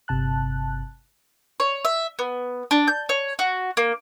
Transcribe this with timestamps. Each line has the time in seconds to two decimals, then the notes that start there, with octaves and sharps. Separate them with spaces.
0.08 G1 C3 A5 F#6
1.60 C#5
1.85 E5
2.19 B3
2.71 D4
2.88 G6
3.09 C#5
3.39 F#4
3.77 A#3